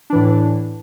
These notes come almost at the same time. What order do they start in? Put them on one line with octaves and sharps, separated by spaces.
D4 E3 A2